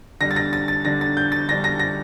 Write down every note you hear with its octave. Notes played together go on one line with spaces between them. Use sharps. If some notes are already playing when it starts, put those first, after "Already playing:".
D3 G3 D4 A#6
A6
A#6
A6
A6
D3 G3 D4 A#6
A6
G6
A6
D3 G3 D4 A#6
A#6
A#6